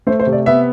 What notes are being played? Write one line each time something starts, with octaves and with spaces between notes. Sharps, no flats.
A3 C5
C5
C3
D5
B3 E5